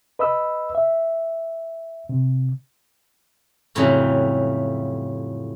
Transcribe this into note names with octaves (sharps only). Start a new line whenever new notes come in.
B4 D#5 B5 E6
E5
C3
F2 A2 C#3 E3 F#3 G3